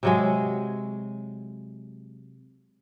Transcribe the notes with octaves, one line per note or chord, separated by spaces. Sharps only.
C3 F#3 G#3